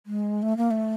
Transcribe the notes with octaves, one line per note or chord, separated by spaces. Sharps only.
G#3
A3
A#3
A3